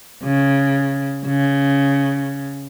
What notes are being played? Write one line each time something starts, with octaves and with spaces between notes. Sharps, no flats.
C#3
C#3